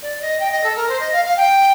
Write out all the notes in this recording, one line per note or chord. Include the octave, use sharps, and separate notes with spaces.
D5
D#5
G5
D#5
A4
A#4
C5
D#5
F5
F5
G5